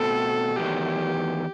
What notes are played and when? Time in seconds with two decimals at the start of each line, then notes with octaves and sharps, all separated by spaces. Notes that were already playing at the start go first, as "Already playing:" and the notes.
Already playing: B2 A3 C4 A4
0.56 E2 D#3 F#3 A3 G4